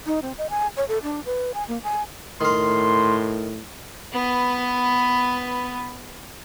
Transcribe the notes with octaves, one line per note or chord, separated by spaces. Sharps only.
D#4
C4
D#5
G#5
C#5
A4
D4
B4
G#5
A#3
G#5
A2 D#3 A#4 C6
B3 B4